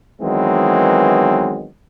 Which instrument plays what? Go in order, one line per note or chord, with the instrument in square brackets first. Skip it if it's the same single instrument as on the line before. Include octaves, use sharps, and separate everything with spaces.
[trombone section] D#3 E3 F#3 G#3 B3 C4